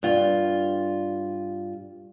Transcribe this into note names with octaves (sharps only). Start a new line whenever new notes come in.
G2 F4